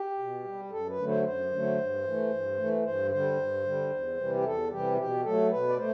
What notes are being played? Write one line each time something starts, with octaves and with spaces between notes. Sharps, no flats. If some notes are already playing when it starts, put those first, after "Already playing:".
Already playing: G4
B2
G3
F#2 A4
B4
D3 F#3 A3
C5
F#2 C5
D3 F#3 A3
G2
E3 A3
G2
E3 A3
G2 C5
D3 G3 C5
G2
D3 G3
E2
C3 E3 G3
G4
E2 A4
C3 E3 G3 G4
B2 G4
F#3 A3 A4
B2 B4
D5
A3 C5